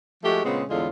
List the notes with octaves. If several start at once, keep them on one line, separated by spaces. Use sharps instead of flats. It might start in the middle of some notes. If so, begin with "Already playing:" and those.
F3 G#3 A3 F#4 G4
A#2 C#3 G#3 B3 C4
E2 A2 D3 G#3 F4